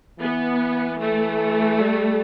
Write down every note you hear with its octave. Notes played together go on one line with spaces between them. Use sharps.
E3 B3
A3
G3